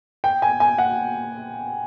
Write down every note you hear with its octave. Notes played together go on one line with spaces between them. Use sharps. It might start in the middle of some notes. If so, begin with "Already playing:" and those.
G5
G#5
G#5
F#5